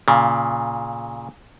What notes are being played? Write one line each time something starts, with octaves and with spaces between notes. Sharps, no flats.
A#2 C#3